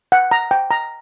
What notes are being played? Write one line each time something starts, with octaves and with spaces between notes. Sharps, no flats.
F#5
A#5
G5
A#5